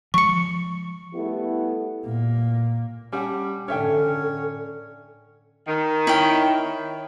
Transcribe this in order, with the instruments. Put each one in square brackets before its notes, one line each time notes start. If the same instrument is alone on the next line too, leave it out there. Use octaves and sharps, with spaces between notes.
[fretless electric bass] F3 G#3 [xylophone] C#6 C#7
[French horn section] G3 A3 B3 E4
[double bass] A#2 A#3
[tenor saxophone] G3 [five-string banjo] C#4 F#5 A5
[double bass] A2 D3 [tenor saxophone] C#4 [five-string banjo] D4 E5 G5 [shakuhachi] A4
[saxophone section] D#3
[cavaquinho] E4 C#5 G5